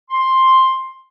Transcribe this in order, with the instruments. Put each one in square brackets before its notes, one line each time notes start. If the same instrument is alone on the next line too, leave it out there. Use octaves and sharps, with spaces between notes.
[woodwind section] C6